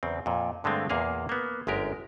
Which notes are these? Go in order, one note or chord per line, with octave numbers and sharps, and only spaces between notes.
E2 C#3 C4
F2 A#2
G2 D3 G#3 A3 C4
E2 A#2 A#3 G#4 F5
A#3 B3
G1 F#2 G#3 G4 A#4